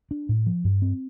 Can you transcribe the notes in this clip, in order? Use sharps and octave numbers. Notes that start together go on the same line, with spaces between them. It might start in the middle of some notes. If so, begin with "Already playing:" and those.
D4
A2
F3
G2
C4